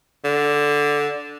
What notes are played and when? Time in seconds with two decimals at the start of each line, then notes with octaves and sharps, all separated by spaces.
0.25 D3